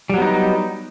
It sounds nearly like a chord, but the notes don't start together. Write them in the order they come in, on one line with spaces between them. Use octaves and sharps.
G3 F#3 B3 D#4